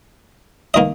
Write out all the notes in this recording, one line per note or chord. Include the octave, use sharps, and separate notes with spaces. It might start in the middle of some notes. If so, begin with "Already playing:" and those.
D#3 A#3 D#5